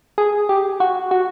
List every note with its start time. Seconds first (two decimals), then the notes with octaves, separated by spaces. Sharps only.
0.18 G#4
0.49 G4
0.80 F#4
1.11 F#4